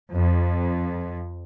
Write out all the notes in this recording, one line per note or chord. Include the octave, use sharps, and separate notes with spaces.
F2